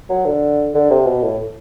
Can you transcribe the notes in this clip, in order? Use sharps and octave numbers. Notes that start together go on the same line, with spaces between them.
F#3
D3
D3
C3
B2
A2